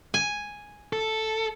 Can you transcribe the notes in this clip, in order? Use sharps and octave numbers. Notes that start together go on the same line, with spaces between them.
G#5
A4